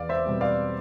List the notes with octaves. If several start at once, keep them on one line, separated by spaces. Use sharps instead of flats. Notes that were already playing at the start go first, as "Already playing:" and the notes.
Already playing: E2 D5 F5
C5 E5
B2 G3 C4
D5 F5